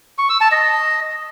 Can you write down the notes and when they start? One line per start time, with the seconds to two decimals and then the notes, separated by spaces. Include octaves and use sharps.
0.18 C#6
0.30 E6
0.41 A5
0.52 D#5